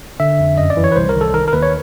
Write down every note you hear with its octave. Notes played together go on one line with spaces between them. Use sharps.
D3 E5
F2
F#2 D#5
D5
E3
C#5
B4
C2 C5
A#4
D#3
A4
D#3 A#4
A#4
D#2 B4
C#5